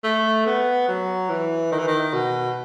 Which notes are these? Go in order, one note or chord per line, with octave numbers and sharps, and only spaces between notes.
A3
B3
F#3
E3
D#3
E3
D#3
B2